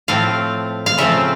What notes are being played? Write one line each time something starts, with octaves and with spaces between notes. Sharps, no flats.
A2 F3 A3 C4 F5
F5
C#3 F3 A3 C4 E5